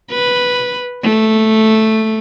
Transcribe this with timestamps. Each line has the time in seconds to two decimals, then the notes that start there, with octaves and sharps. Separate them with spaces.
0.11 B4
1.03 A3